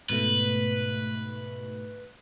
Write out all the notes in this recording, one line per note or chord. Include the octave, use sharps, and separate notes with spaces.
G#2 B2 A3 B4